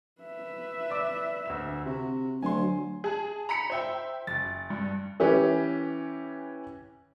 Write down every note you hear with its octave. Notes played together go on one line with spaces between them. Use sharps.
B4 E5
D5 D6
D2 E6 E7
C3 F#4
D2 F#3 G#5 C6
G#4 A5
A#5 B5 B6 C#7
C5 E5 G5
F#1 A6
G2
E3 C#4 G4 B4